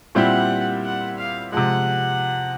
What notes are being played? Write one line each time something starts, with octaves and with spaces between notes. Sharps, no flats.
A#2 G3 C4 E4 G4 F#5
F#5
F5
C3 F3 G#3 F#5